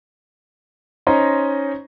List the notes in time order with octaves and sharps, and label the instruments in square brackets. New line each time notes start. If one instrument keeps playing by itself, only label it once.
[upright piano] C#4 D#4 C5 D#5 A#5 C6